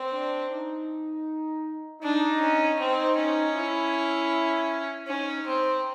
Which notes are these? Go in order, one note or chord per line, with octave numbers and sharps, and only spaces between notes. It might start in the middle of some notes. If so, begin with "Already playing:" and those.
Already playing: C4
D4
D#4
D4 D#4
C#4
C4 D#4
C#4
E4
C#4 D#4
C4